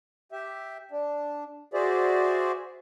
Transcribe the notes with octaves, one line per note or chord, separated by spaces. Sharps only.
G4 E5
D4
F#4 G#4 C5 D5 E5